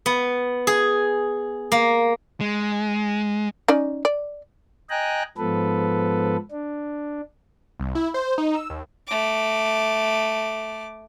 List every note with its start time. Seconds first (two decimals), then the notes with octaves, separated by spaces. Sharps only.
0.06 B3
0.67 G#4
1.72 A#3
2.41 G#3
3.68 C#4 D#4 D5
4.05 D5
4.90 D#5 G5 G#5 A#5 F#6
5.38 G#2 F3 B3 A4 B4
6.51 D4
7.80 C2
7.95 E4
8.14 C5
8.38 D#4
8.55 E6
8.70 D#2
9.07 A3 D6